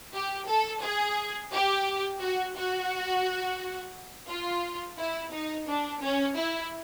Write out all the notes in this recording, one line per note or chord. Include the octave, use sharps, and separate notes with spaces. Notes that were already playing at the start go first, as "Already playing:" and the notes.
G4
A4
G#4
G4
F#4
F#4
F4
E4
D#4
D4
C#4
E4